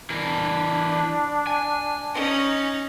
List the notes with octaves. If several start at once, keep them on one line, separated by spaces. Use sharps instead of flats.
E3 D4 A#4
G#5
C#4 D#4